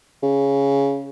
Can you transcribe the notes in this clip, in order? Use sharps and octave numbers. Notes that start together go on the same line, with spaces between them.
C#3